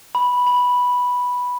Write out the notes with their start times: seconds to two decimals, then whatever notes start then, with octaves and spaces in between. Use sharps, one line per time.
0.15 B5
0.47 B5